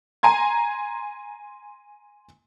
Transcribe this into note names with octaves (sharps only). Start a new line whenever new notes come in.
G#5 A#5 C6 G#6